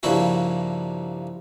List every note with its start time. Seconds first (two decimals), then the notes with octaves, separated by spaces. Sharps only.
0.03 G2 C#3 F3 A#3 E4 F#4